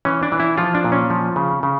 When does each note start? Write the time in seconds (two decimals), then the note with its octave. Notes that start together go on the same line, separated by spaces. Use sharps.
0.05 E3 C#4
0.23 D4
0.32 E3
0.40 E4
0.57 F3 F4
0.75 D4
0.84 A#2
0.92 C#4
1.10 F3
1.36 C#3
1.63 C#3